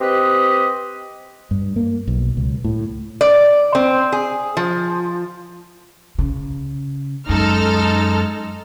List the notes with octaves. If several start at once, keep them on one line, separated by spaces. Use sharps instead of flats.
C4 G4 B4 D#5
G2
A#3
B1
C#2
A2
D5
C4
G#4
F3
C#3
F#2 G#3 D#4 A4 F6